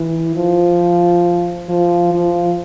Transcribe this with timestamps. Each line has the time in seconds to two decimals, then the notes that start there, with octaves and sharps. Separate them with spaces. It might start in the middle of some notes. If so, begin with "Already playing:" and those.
Already playing: E3
0.35 F3
1.69 F3
2.13 F3